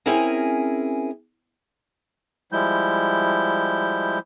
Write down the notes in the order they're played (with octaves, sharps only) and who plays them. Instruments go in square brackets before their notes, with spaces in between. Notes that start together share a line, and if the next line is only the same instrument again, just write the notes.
[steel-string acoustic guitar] C4 C#4 E4 G#4 A#4 G#5
[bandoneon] F3 G3 G#3 E4 G6